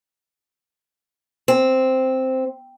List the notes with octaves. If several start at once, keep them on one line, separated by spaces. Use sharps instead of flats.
C4